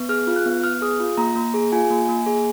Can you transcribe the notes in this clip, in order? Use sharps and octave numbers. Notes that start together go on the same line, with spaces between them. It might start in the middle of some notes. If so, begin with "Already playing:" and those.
Already playing: B3
G#4 F6
F4
F#6
B3
B3 F6
G#4 D#6
F4
A#3 A#5
A#3
G#4
F4 G#5
A#3
A#3
G#4